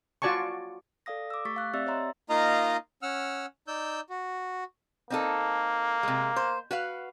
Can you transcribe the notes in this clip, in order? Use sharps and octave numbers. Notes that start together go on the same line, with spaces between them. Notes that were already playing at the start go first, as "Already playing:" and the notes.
F4 F#4 D5 G#5 A5 C#6
A4 D5 F5 D#6 A#6
D6 E6
A3 G4 C#6 A6 B6
F5 F#6
C4 G4 D5 E5 E6 A6
C#5 D#5 E5 A#5 C6
A#3 D#4 F4 D#5 F5 A#5
C#4 F#5 E6 F6
D#4 D5 E6 G6
F#4
A#3 C4 D#4 A4
C3 G#3
C5
F#4 B4 F5